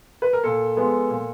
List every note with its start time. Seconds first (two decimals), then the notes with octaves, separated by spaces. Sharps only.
0.22 B4
0.33 A#4
0.44 A#2 A4
0.76 F3 G#3 B3
1.09 A#2